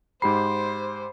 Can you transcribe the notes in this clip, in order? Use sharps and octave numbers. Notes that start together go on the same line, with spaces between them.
G#2 G4 C5 B5 C7